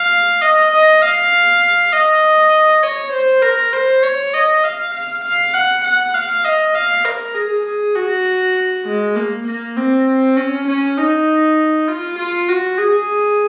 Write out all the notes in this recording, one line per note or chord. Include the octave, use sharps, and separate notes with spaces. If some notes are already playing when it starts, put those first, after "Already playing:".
Already playing: F5
D#5
D#5
F5
D#5
C#5
C5
A#4
C5
C#5
D#5
F5
F5
F5
F#5
F#5
F5
D#5
F5
A#4
G#4
G#4
F#4
G#3
A#3
A#3
C4
C#4
C#4
D#4
F4
F4
F#4
G#4